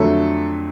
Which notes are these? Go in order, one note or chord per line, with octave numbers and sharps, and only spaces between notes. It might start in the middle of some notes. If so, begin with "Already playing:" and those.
Already playing: F2 D3 F#3 A3 A4